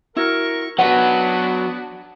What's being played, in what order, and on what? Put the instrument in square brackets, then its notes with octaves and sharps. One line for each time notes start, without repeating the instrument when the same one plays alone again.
[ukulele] E4 F#4 [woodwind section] A#4 [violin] C#6
[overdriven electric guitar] F#3 B4 [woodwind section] B3 [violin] D4 F#4 [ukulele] F#5